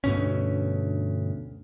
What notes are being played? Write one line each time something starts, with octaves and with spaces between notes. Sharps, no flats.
D2 G2 B2 C#4